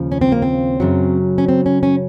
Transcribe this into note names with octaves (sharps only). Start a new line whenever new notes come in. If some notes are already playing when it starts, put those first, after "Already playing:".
Already playing: D#2 C#3 F3
C#4
C4
A#3
C4
F#2 C#3 F#3
C#4
C4
C#4
C#4